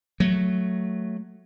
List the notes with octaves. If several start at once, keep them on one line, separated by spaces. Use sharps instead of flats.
F#3 A3